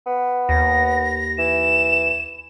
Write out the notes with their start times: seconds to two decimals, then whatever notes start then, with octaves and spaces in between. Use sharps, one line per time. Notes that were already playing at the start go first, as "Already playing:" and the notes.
0.06 B3
0.49 D#2 A#6
1.38 E3 E7